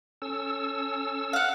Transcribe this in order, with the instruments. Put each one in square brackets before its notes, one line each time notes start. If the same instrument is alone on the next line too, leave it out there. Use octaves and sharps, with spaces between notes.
[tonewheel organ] C#4 A4 E6
[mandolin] F5 F#5